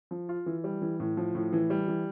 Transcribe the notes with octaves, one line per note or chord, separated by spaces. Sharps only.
F3
F4
E3
G3
E3
A2
F3
A2
E3
G3
E3